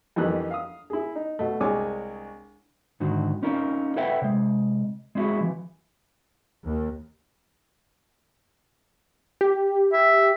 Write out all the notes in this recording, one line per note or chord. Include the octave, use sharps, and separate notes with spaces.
F2 D#3 E3 G3 D4 F#6
F5 D#6
E4 G#4
D#4
B2 A3
C2 G#3 D4 C#5 G#5 D6
G#2 D3 D#3 F#4
C4 C#4 D#4 F4 A#4
A4 B4 C#5 E5 F#5 G5
C3 G#3
G#3 C4 D4 E4 F#4 G#4
E3 F3
D#2
G4
E5